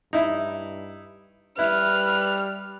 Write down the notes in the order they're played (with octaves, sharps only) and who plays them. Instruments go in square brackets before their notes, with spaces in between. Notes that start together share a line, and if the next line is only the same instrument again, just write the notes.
[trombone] G2 [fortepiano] D#4 E4
[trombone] G3 [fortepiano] E4 [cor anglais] B4 [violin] F6